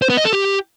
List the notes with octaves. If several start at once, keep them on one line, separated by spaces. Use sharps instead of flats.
C5
B3
D#5
A4
G4